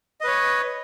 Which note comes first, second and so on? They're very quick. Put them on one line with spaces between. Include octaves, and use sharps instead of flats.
D#5 B4 C#5